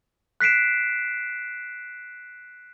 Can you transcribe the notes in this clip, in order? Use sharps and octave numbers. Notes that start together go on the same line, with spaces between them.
F#6 B6 C7 D7 E7